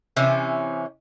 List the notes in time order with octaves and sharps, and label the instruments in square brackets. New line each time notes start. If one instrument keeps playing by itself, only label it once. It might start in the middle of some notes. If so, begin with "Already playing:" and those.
[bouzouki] C3 E3 C#4